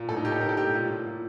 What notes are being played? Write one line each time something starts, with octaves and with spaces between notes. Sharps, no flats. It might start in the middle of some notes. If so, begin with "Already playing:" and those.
Already playing: A#2
A2 A4
D#4
A2 G4
A4
A2 A#4
A4
A2 G4
A#2
A#2
A#2